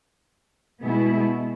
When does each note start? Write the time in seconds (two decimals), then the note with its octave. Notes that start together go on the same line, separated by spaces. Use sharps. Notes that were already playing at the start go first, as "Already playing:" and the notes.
0.81 B2 G#3 B3 E4